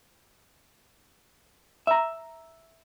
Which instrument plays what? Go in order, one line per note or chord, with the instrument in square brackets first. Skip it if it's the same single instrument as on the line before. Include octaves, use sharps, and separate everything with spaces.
[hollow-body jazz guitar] E5 A#5